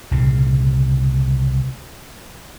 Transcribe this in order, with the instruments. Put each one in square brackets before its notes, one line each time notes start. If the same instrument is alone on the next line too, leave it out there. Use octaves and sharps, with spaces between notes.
[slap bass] C2 A#2 C#3